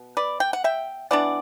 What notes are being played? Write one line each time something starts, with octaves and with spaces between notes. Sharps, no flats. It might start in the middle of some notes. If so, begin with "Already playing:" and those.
Already playing: B2
B4 D5
G5
F#5
E5 G5
E3 B3 D4 D5 F#5